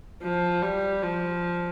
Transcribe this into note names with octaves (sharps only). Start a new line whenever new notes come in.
F3
G3
F3